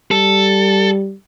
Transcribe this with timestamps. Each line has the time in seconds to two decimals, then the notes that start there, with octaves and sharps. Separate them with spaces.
0.11 G3 A4